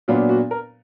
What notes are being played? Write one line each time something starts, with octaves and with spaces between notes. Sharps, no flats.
A#2 F#3 B3 D4 F4
F#4
A#4